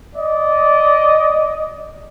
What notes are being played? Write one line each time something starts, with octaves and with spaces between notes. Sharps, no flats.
D5 D#5